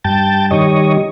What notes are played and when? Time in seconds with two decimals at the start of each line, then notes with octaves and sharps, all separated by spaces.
0.04 G2 G5 A5
0.51 D#3 G3 C#5 D#5